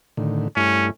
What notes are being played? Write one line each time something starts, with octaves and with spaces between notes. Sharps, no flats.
A2 D3 D#3
G2 A3 C#4 E4